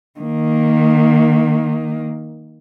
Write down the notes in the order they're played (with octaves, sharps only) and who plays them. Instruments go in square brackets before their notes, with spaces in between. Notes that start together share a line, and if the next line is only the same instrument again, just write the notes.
[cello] D#3 A#3